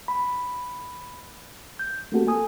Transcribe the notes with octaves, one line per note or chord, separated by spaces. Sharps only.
B5
G6
A3 A#3 C4 F#4 G4 A4
A4 G#5 D#6